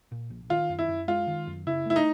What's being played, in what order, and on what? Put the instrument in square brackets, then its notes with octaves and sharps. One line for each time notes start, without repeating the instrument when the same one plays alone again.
[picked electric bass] A#2
A#1
[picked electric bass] D#3 [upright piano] F4
[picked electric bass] F#2
[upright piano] E4
[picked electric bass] F#2
[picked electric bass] G#3 [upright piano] F4
[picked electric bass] D#3
F#2
[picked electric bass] C#3 [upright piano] E4
[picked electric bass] A3 [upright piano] E4
[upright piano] D#4